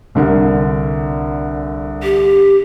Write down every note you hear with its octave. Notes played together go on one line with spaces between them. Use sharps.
C2 D3 A#4
G4